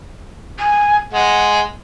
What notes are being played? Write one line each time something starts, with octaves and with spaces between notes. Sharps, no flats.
G#5
G#3 F#5